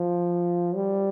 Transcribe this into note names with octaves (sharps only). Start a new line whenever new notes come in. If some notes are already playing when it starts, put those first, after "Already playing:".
Already playing: F3
G3